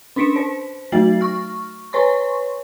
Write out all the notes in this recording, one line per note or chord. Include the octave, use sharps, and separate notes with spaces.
C#4 D4 B6 C#7 D7 E7
C5
F#3 A3 F#4 A6 C7 F#7
C#6 F6
B4 C#5 C6 C#6